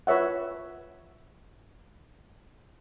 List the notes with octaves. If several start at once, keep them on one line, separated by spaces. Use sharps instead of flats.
F4 B4 C#5 E5 F#5